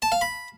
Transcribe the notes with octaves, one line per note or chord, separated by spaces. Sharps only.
A5
F5
B5